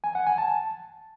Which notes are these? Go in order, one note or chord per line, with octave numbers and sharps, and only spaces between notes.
G#5
F#5
G#5
A5